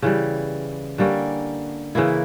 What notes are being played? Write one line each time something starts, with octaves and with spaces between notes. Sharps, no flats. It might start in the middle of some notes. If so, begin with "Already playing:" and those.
C#3 E3 G3
D3 G3 A#3 C#4
C#3 E3 A#3 E4